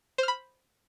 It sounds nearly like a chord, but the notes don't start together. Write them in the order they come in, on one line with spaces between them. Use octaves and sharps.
C5 F6 B5